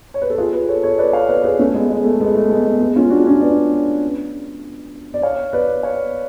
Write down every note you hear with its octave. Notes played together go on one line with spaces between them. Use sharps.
C#5
B4
A4
F4 G#4
G#4 B4
A4 C#5
A4 C#5
B4 D5
C#5 F5
B4 D5
G#4 B4
A3 C#4
G#3 B3
G#3
A3
G#3 B3
A3
G#3 B3
G#3 B3
G#3 B3
C#4 F4
D4 F#4
C#4 F4
B4 D5
D5
C#5 F5
B4 D5
C#5 F5